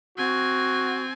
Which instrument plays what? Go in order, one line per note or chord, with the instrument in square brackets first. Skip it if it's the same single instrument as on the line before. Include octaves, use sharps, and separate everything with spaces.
[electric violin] C4 G#5 [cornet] F#4